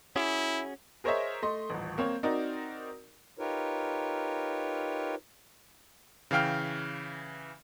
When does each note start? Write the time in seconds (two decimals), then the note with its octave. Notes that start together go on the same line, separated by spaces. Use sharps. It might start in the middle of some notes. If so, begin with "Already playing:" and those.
0.16 C#4 E4 F#4 G#4
1.04 G#4 A#4 C5 C#5 D#5 E5
1.42 A3 D#5 C6
1.70 D#1 A1
1.98 A#3 C4 C#5
2.23 C4 D#4 F#4 A#4 D5
3.39 D#4 F4 G4 A#4 B4 C#5
6.31 C#3 E3 F5 G5 F6